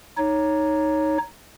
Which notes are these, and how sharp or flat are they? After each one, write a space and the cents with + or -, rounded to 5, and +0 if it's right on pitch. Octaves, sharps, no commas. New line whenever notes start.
D#4 +0 C#5 +0